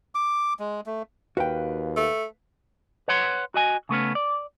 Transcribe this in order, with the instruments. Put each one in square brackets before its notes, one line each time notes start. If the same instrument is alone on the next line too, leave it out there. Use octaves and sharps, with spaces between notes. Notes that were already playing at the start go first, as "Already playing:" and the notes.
[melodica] D6
G#3
A3
[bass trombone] D#2 [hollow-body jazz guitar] F#4 G5 [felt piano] B4 F5
[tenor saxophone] A3
[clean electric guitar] B4 C#5 F#5 C6
F#4 D#5 G#5
C#3 A3 B3 C#4
D5